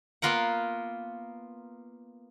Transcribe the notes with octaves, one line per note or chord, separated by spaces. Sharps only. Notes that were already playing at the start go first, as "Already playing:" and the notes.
A#3 B3 F4 A#4 F#5